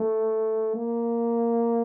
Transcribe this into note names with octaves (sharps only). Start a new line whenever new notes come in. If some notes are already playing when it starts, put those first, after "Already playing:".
Already playing: A3
A#3